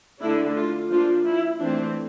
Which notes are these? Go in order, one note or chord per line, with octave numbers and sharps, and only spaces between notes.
D3 A3 D4 E4
F4
F3 A#3 D4 F4
E4
E3 A3 C4 D4